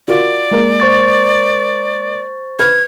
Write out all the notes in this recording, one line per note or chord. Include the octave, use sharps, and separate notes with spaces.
F4 F#4 A#4 D5
G#3 A#3 A#4
C5 C#6 A6
B4 F6 G#6